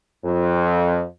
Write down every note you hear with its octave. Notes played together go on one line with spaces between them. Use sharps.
F2